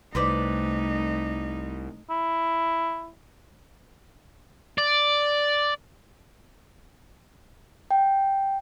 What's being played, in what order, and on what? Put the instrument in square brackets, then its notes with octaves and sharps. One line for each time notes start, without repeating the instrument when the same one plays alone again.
[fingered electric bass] C2 [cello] A3 D#4 [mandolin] B4 C5 D5
[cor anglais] E4
[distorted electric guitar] D5
[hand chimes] G5